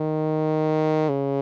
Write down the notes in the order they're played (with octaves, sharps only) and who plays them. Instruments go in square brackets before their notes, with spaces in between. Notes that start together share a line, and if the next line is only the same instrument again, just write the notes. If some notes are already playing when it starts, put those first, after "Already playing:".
Already playing: [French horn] D#3
C#3